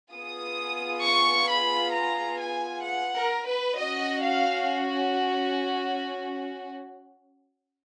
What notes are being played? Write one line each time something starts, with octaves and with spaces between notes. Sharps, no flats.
B3 F4 G#4 D#6
C#6
B5
A#5
G#5
F#5
A#4
B4
C#4 F#4 D#5
F5